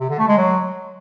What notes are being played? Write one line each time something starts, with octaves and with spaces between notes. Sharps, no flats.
C3
D3
A3
G#3
F#3